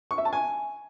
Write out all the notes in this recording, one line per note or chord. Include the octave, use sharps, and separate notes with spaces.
C#6
E5
A5
G#5